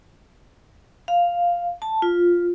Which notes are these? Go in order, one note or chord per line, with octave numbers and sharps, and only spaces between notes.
F5
A5
F4